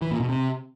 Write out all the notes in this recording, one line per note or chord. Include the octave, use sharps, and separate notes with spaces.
E3
A#2
B2
C3